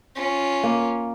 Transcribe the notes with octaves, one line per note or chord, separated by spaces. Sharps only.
C#4 F4
A#3